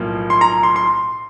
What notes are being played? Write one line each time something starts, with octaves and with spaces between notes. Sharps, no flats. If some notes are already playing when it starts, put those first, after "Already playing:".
Already playing: B1 A2 F3 A#3
C6
A#5
C6
C6